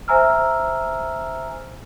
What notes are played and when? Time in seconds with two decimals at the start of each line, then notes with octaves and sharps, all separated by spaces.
0.08 C5 E5 G#5 A#5 E6 F6